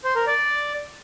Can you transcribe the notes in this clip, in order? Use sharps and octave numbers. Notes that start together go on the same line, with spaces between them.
C5
A#4
D5